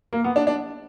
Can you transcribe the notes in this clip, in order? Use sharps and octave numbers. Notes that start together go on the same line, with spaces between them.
A#3
B3
D4
D4